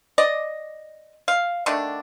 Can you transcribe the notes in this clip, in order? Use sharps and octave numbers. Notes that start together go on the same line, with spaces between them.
D5 D#5
F5
D3 D#3 A3 D4